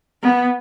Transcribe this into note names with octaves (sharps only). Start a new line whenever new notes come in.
B3